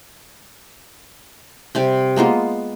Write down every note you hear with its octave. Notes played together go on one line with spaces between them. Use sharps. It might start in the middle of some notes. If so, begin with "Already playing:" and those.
C3 G3 C4
G#3 A#3 B3 F4